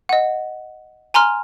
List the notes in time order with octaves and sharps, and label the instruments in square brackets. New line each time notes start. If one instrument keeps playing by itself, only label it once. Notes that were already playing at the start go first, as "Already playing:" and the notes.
[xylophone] D#5 F#5
G#5 A#5 C6 F6